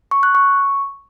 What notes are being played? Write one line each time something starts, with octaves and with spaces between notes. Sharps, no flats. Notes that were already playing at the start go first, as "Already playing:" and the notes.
C#6
F#6
C#6